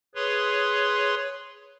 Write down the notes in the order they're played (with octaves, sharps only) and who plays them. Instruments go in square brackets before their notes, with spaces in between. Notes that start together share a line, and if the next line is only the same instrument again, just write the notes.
[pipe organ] G#4 B4 C#5 C6